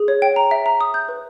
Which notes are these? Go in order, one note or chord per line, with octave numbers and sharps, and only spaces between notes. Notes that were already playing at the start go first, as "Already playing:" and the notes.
Already playing: G#4
C#5
G5
A#5
E5
A#5
D#6
G6
B4